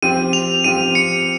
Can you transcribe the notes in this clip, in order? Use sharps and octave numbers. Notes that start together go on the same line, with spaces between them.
F3 C4 G4 D#7
F7
F3 C4 G4 D#7
C#7